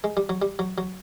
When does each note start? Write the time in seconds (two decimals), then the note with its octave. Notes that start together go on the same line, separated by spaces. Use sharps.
0.04 G#3
0.17 G3
0.29 F#3
0.42 G3
0.59 F#3
0.78 F#3